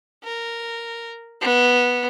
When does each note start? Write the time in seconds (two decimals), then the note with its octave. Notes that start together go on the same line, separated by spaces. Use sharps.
0.24 A#4
1.41 B3